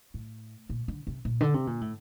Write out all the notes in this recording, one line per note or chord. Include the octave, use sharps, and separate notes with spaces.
A2
A#2
D3
C3
A#2
D3
C3
A#2
A2